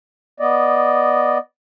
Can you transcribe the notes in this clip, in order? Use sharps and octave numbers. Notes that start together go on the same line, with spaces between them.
B3 D5 D#5